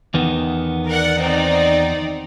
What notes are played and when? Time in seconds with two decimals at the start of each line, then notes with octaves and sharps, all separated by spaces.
0.14 E2 D#3 B3
0.87 A#4 D5 F#5
1.20 C4 D#4 D5